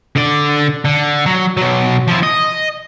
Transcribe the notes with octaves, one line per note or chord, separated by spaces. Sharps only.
D3 D5
D3
F#3
B2 F#3
F3 E4
D#5